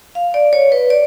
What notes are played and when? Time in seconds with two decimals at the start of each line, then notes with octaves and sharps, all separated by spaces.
0.15 F5
0.34 D5
0.53 C#5
0.72 B4
0.90 D5